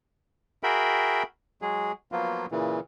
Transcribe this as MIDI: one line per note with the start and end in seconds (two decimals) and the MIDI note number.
0.63 1.23 66
0.63 1.23 68
0.63 1.23 70
0.63 1.23 76
0.63 1.23 79
0.63 1.23 83
1.62 1.92 54
1.62 1.92 56
1.62 1.92 68
2.12 2.46 53
2.12 2.46 54
2.12 2.46 58
2.12 2.46 59
2.12 2.46 65
2.52 2.80 46
2.52 2.80 49
2.52 2.80 52